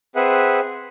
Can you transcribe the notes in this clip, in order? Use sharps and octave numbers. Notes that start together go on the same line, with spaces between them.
C4 G#4 B4 E5 F#5